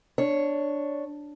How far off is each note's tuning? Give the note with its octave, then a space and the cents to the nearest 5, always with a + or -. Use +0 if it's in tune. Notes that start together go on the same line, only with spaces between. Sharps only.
D4 +0 C#5 +0